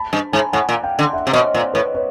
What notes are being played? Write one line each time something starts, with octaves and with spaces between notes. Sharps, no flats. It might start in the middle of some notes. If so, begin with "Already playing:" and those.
Already playing: A5 B5
G2
G#2 G#5 A#5
A2 F#5 G#5
A#2
F5 G5
D3
E5 F#5
C3
B2 C#5 D#5
A#2 C5 D5
A2 B4 C#5
B4 C#5